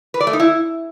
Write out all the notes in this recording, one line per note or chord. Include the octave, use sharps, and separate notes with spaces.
B4
D5
A3
D#4
E4